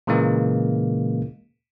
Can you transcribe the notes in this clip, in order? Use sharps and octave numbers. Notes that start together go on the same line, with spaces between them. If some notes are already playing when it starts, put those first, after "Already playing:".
A#2 C#3 E3 G#3 A#3